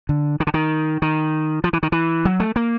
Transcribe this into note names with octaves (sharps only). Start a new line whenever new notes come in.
D3
D#3
D3
D#3
D#3
F3
E3
D#3
E3
F#3
A3
A#3